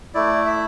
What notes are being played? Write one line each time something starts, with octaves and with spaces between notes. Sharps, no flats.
A3 E4 D5
E5